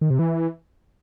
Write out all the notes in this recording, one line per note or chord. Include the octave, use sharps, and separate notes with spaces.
D#3
C3
E3